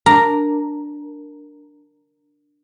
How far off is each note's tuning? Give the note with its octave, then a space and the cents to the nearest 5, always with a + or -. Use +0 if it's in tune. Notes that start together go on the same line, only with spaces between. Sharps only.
D4 +0 A#4 -5 A#5 +0